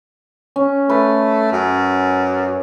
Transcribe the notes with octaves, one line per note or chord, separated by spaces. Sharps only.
C#4
A3 B4
F#2